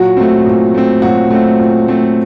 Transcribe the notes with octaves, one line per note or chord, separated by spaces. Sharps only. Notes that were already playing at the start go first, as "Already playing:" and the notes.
Already playing: A#2 F#3 F#4
A3 C4
A#2
A3 C4
A#2 F#3 F#4
A3 C4
A#2
A3 C4